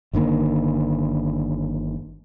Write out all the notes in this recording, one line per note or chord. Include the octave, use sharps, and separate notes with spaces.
G1 D3 D#3 A#3